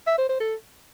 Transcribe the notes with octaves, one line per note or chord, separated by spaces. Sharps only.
E5
C5
C5
A4